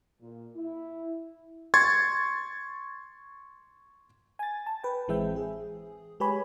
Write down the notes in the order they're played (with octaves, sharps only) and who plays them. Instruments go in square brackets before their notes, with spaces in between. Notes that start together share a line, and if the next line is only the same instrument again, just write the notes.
[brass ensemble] A#2
E4
[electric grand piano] C6 C#6 G#6 A6
[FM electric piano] G#5 A6
A5
B4 G5
A1 E3 G#3 C4 E5 G5
G#4
G#3 G4 B4 C#5 G#5 B5